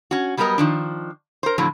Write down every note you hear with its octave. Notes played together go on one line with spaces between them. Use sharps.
C#4 F#4
F#3 G3 A3 B3 A#4 D#5
D#3 F3 D4
A#4 C5
A2 D3 F3 F#3